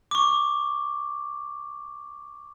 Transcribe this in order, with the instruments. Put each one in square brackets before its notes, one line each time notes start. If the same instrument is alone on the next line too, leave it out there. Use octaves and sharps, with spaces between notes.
[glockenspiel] C#6 D6